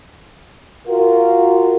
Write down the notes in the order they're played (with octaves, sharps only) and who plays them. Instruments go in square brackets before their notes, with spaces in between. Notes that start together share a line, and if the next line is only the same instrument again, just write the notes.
[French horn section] F4 F#4 A#4